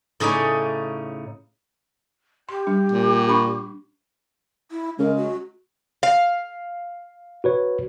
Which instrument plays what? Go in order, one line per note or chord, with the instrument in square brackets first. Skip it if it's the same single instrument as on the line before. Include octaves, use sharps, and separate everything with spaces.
[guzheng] A2 C#3 C#4 D#4 D5
[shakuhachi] G4 [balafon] C6
[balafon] G3 D4
[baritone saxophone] A#2
[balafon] D4 B5 C#6
[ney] E4
[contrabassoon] C#3 [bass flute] G#3 [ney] A#4
[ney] F#4
[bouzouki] F5
[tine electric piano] F#4 B4 C#5